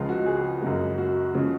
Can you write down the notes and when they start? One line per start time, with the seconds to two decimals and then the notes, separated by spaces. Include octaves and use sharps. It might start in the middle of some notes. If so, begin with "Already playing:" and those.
Already playing: C#2 C#3 F3 G#3 F4
0.09 F#4
0.26 G#4
0.62 F#2 C#3 G#3
0.98 F#4
1.34 C#3 F3 G#3